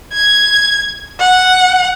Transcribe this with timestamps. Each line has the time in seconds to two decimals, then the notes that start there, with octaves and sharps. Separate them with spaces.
0.13 G#6
1.20 F#5